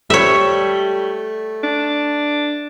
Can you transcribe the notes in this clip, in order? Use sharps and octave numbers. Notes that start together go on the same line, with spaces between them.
G3 A3 C#5 E5
D4